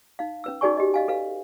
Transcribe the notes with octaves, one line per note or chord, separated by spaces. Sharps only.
D#4 F5
C#4 B4 E6
D#4 F#4 G#4 D5 G#5 C#6
G4 D#5
D#5 F5 G#5
A4 B4 F5